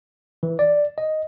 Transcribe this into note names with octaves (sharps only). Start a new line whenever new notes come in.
E3
D5
D#5